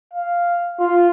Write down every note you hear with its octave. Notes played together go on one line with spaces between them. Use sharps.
F5
F4